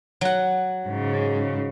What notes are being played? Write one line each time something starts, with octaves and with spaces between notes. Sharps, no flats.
F#3 F#5
G#2 C#3